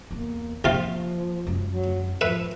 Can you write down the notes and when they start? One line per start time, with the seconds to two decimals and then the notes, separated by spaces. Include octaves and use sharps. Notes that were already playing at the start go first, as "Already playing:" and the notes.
0.11 E2 A#3
0.64 C3 F3 A#3 F4
1.47 F#2 G#3
1.69 F#3
2.21 F3 B4 E5